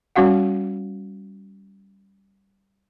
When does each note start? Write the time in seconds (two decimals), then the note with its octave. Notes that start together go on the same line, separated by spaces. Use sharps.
0.16 G3 C#4 F#4 F5 F#5